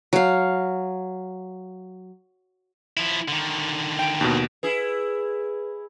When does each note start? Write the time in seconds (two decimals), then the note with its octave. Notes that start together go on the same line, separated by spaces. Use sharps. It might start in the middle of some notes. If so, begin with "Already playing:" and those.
0.13 F#3 F5
2.97 F3 E4
3.28 D3 D#3
3.99 G5 D7
4.21 D#2 B2
4.63 E4 G#4 B4